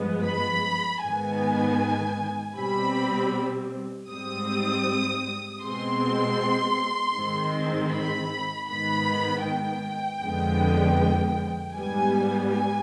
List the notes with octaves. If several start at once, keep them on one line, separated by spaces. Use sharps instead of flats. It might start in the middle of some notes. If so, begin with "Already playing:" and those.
Already playing: G2 F3 G#3 B3
B5
G#2 D#3 B3 G#5
B2 G3 C4 B5
G#2 G3 C4 D#6
B2 G#3 C4 C6
G#2 D#3 G#3 C4
B5
G#2 D#3 B3 B5
G5
F2 D3 F3 G#3 B3
G#2 G3 B3 G#5
G#5